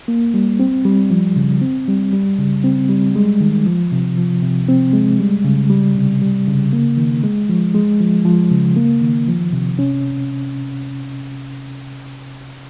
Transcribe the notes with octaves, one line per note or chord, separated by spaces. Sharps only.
A#3
G3
C4
G3
F3
C#3
C4
G3
G3
C#3
C4
G3
G#3
D#3
F3
C3
F3
C3
C4
G#3
G3
C#3
G3
C3
G3
C#3
A#3
D#3
G#3
F3
G#3
F3
F3
C#3
A#3
D#3
F3
C3
C#4